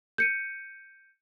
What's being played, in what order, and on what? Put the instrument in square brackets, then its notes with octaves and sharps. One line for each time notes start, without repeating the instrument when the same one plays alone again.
[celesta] G6 C#7 D#7